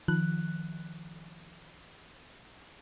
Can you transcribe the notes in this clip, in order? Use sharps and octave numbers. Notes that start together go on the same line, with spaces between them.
D#3 F3 F#6